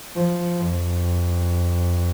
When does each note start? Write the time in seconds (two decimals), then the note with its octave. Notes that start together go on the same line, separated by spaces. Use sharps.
0.16 F3
0.59 F2